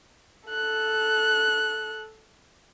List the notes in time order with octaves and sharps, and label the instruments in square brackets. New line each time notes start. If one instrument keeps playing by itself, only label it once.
[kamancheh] A4 F#6